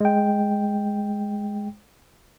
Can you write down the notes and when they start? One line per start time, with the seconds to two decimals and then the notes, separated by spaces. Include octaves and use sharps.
0.01 G#3 G5